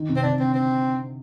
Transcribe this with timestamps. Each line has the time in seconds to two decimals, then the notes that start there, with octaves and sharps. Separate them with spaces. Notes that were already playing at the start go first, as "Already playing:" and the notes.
Already playing: D#3
0.09 C3
0.16 C4
0.23 D3 D4
0.39 C4
0.54 C4